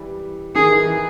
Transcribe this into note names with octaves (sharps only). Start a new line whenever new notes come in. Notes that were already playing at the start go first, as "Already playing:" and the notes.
Already playing: E3 G3
D#3 G#4
E3
E3